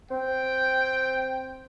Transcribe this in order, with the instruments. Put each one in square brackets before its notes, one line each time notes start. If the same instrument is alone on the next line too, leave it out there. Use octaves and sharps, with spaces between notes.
[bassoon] C4 [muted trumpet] G5